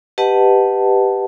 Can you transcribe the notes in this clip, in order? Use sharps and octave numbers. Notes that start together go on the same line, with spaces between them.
G4 B4 D#5 F#5 A5